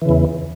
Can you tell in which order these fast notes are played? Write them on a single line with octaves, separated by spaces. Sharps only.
E3 C#3 E2